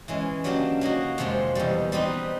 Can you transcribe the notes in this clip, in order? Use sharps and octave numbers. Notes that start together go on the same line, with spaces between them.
E3 G#3 C#4
C#3 F#3 A#3 D4 G4
F#3 A#3 D#4 F#4
F2 C3 F3 G#3
E2 B2 G3
G3 C4 D#4 G4 B4